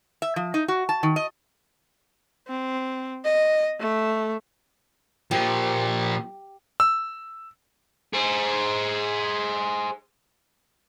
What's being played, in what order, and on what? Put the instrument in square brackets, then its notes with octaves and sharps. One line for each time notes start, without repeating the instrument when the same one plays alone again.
[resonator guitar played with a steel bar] E5
F3
D#4
F#4
A5
D#3
D#5
[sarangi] C4
D#5
A3
[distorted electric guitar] A#2 F3 [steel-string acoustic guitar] G4
[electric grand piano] E6
[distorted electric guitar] G#4 C5